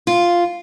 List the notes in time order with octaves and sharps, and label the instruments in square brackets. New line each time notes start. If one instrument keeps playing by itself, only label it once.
[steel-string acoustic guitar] F4